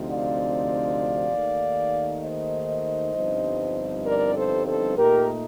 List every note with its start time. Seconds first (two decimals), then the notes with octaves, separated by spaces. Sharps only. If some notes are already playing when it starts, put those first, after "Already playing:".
Already playing: D2 C3 F3 C4 D#4
0.10 D5 F5
1.32 D#2 D#3 A3 D#4
2.23 C5 D#5
3.15 G1 G2 F3 C4 D#4
4.06 A#4 D5
4.36 A4 C5
4.67 A4 C5
4.97 A#2 A3 D#4 G4 A#4